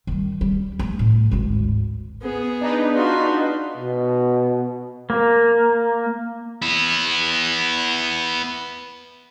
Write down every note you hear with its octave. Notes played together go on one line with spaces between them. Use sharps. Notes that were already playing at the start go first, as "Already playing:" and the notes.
D#3 G3
G3
A3 B3
A2
G#1 D2
B3 G#4
D4 D#4 B4
F4 F#4
B2
A#3
B3 E4